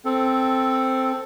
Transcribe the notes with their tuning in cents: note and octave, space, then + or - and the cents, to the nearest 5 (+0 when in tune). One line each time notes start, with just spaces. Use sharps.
C4 +0 A4 +0